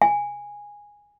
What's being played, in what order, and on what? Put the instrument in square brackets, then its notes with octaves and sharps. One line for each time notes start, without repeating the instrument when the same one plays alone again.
[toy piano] G#5